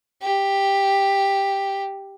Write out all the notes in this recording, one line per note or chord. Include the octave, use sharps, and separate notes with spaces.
G4